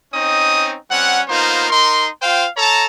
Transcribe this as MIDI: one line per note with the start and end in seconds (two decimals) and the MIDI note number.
0.13 0.75 60
0.13 0.75 61
0.13 0.75 63
0.13 0.75 75
0.13 0.75 87
0.89 1.20 55
0.89 1.20 60
0.89 1.20 61
0.89 1.20 78
1.28 1.69 58
1.28 1.69 59
1.28 1.69 63
1.28 1.69 65
1.28 1.69 72
1.70 2.08 63
1.70 2.08 70
1.70 2.08 84
2.22 2.46 65
2.22 2.46 72
2.22 2.46 77
2.22 2.46 79
2.57 2.86 69
2.57 2.86 73
2.57 2.86 81
2.57 2.86 82